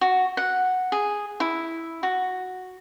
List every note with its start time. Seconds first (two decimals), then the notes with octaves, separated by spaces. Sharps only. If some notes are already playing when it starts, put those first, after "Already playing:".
0.01 F#4
0.37 F#5
0.92 G#4
1.40 E4
2.03 F#4